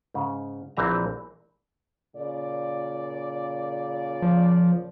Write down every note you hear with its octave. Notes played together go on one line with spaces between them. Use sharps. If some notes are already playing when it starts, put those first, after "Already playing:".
G#2 C#3
A#1 E3 C4 E5 A#5
A#2 C#3 D5
F3